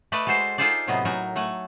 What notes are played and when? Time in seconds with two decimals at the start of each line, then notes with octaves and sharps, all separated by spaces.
0.12 A3 B4 D5 D#5
0.27 G#3 F#4 A4 C5
0.58 D#4 F4 G#4 A4 C5 D5
0.87 A2 C3 F#3 B3 D#5
1.05 A2 F#3 D#4 A#4 G#5
1.36 A3 F#5 G#5